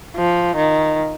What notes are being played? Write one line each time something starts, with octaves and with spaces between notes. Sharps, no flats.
F3
D#3